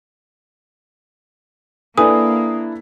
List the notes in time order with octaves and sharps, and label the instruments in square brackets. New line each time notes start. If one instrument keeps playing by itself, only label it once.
[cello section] A#3 [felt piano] D4 E4 [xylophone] A4 B4 G#5 [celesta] D#6